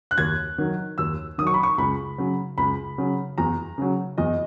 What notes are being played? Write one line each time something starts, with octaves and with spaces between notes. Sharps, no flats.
F#6
D#2 G#6
D#3 F#3
D#2 E6
D#3 F#3 C#6 D#6
B5
C#6
C#2 B5
C#3 F#3
C#2 B5
C#3 F#3
E2 A#5
C#3 F#3
E2 D#5